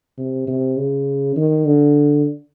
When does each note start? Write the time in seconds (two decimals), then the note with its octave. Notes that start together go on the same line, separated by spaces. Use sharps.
0.18 C3
0.48 C3
0.77 C#3
1.36 D#3
1.66 D3